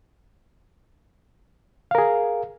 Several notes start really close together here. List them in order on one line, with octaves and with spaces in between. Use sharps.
F5 A#4 G#4